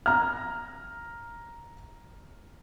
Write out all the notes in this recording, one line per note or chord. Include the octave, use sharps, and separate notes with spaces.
A#5 F6